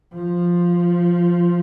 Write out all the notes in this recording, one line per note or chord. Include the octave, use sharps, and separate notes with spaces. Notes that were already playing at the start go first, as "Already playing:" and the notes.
F3